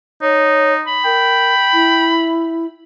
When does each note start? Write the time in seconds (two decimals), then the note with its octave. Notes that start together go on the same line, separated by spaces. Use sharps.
0.22 D#4 C#5
0.86 B5
1.05 A#4 G5
1.73 E4